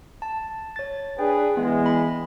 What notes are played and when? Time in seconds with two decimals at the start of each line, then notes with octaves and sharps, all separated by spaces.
0.22 A5
0.76 C#5 A6
1.19 D4 G#4 B4 G5
1.57 E3 G#3 B3
1.86 B5